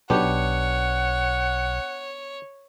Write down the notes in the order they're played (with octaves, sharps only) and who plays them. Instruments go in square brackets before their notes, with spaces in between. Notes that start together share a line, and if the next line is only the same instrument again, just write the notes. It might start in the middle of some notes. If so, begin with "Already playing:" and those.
[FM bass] B1 [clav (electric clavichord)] B3 D4 G4 [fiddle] C#5 [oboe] F#5